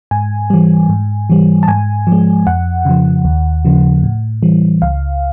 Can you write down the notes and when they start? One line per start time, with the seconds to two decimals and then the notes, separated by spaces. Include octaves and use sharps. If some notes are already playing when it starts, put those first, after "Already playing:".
0.11 G#2 G#5
0.50 E3 G3
0.89 G#2
1.30 E3 G3
1.63 A5
1.68 G#2 G#5
2.07 F3
2.12 G#3
2.47 F2 F#5
2.85 C#3 F3
3.25 D#2
3.65 C#3 F3
4.03 A2
4.43 E3 G3
4.82 C#2 F5